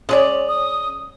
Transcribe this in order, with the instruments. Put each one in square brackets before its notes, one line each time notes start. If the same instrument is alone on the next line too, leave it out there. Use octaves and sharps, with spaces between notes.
[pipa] G#3 G#4 D5 [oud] C#4
[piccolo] D#6